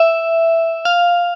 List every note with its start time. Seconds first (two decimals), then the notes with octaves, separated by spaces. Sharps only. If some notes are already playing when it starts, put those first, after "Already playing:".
Already playing: E5
0.85 F5